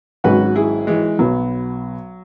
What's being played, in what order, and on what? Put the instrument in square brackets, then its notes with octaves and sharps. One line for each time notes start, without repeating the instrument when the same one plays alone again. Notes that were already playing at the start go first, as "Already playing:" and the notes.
[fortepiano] G#1 G#2 F#3 C#4 [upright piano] F#4 B4
[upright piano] E4 G#4
E3 G#3
[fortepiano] B1 B2 B3 [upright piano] F#3